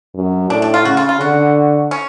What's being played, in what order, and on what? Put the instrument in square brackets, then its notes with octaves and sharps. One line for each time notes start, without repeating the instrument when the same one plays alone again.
[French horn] F#2
[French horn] A2 [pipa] D4
[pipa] D4
F4
[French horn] C#3 [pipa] F#4
[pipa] F4
F4
[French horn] D3 [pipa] F#4
[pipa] C#4